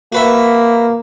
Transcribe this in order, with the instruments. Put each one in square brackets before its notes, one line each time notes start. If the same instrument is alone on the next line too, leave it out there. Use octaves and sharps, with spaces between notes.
[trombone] A#3 [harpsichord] F#4 B4 E5